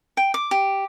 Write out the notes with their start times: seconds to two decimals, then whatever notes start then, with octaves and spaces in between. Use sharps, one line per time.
0.17 G5
0.34 D6
0.51 G4